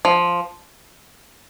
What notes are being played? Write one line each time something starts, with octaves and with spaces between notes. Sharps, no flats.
F3